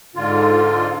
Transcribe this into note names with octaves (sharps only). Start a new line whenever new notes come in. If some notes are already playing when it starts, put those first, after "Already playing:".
G#2 D3 F4